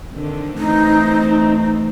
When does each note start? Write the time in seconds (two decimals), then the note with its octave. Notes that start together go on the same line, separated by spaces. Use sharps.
0.14 D3 D#3 C4
0.58 E3 A3 C4 D#4